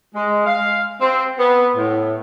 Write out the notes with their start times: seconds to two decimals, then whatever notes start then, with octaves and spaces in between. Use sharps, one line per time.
0.15 G#3
0.46 F5
1.01 C4
1.38 B3
1.76 A2